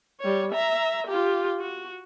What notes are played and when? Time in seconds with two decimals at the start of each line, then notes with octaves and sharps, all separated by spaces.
0.20 G3 C#5
0.52 E5 A#5
1.07 F4 G4
1.59 F#4